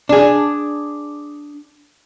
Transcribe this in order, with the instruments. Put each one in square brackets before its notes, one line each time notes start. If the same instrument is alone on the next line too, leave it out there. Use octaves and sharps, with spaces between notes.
[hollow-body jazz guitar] D4 G#4